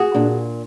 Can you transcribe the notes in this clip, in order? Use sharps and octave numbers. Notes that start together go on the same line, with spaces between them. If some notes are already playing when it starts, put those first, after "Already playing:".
Already playing: F#4 G#4
A#2 D4